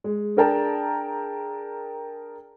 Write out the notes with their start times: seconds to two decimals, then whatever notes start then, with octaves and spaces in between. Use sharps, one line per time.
0.04 G#3
0.37 D4 G#4 A#4 G5 A5 A#5